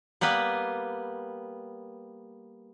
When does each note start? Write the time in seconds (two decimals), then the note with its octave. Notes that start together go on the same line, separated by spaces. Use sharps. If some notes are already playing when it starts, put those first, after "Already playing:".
0.21 G3 A#3 B3 B4